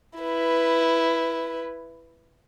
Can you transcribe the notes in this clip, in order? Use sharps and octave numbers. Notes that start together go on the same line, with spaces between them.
E4 B4